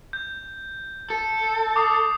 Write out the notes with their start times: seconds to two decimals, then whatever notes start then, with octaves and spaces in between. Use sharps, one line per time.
0.13 G6
1.10 A4
1.76 D6 D#6 C7